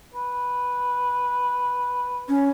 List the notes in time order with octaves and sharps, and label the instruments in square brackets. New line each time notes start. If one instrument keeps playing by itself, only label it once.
[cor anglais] B4
[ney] C#4